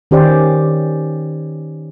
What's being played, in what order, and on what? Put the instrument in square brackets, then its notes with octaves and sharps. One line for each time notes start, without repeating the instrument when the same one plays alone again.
[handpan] D#3 C#4 G4 C5 D5